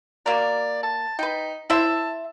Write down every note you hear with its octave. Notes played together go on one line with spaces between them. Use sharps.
A#3 F#4 A#4 D5
A5
D#4 B4 G5
E4 C5 E5 A5